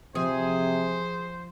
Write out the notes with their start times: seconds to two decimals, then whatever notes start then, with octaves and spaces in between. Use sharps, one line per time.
0.15 C3 F3 G#4 C5